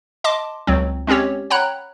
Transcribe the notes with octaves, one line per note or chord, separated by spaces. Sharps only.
D#5 A5 C6 D6
C#2 F#3 C4
G#3 C4 C#4 G4 C#5
C#5 F#5 G5 A#5 B5 F#6